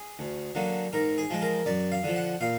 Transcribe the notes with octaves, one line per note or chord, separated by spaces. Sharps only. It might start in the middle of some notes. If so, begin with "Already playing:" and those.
Already playing: G#4
D2
D3 F#3 A#3
G#2 A#4
G#4
F3 G#3
A#4
F#2 D5
F5
D3 F3
F#5
A#2 F5